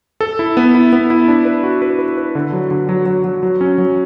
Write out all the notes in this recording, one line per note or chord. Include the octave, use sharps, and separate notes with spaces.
A4
E4
B3
E4
B3
E4
D4
B4
F#4
B4
B4
B4
D3
F#3
D3
F#3
F#3
F#3
F#3
C#4
F#3